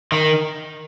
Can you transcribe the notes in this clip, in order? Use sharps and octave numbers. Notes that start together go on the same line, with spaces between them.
D#3